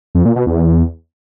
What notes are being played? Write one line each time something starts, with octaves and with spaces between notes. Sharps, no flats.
F2
A#2
B2
E2